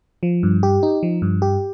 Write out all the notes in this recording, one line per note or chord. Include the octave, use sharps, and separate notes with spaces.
F3
G2
G4
D#4
F3
G2
G4